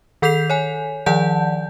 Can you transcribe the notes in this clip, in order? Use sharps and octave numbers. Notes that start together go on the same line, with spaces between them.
D#3 A4 G6 B6 C7 F7
C#5 G#5
D#3 F3 D5 F#5 A5 G6